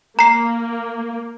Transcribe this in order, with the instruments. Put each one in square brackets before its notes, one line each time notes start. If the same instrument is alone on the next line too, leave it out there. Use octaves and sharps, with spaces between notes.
[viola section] A#3 [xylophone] A#5 C7